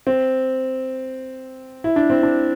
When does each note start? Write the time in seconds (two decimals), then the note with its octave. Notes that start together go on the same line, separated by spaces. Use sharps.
0.07 C4
1.84 E4
1.96 D4
2.10 C4
2.23 D4